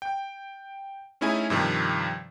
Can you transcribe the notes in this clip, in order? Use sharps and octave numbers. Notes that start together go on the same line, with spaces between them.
G5
A3 C#4 D#4 E4 G#4 G#5
G2 C3 D#3 F3